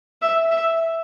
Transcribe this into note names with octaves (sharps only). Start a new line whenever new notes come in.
E5
E5